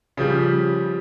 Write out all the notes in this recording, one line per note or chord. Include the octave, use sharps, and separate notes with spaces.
C#3 F3 G3